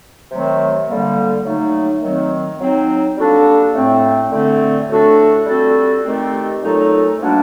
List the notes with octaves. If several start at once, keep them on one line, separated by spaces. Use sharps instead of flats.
C3 D#3 F#3 A3 C4
D3 G3 A#3
F#3 A3 D#4
D#3 F#3 C4
F#3 C4 D#4
G3 A#3 D4 F#4 A4
A2 A3 C4
D3 A3 C4
A2 A3 D4 F#4 A4
G3 C4 F#4 A4
D#3 A3 C4 G4
A#2 F#3 A3 D#4 A4
C3 G3 A#3 D4 F#4